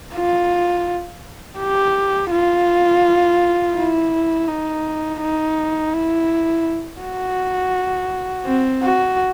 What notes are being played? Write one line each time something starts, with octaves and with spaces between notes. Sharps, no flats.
F4
G4
F4
E4
D#4
D#4
E4
F#4
C4
F#4